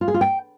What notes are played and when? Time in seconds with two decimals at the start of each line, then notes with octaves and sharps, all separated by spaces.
0.01 F4
0.08 G#4
0.14 F4
0.21 G5